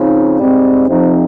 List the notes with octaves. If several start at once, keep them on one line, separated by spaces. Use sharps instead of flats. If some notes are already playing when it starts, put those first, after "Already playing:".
Already playing: C#3 F3 C4 D#4
G#2 G3 C4
F2 C3 F3 C4 D#4